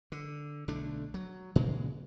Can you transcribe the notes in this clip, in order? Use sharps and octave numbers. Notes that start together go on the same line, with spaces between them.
D3
B1 D3 A3 D4
F#3
A#2 C#3 E3 G#3